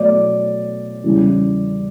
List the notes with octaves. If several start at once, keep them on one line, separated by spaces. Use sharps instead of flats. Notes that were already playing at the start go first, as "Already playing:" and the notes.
Already playing: B2 F#3 A3 D5
E2 C#3 E3 G3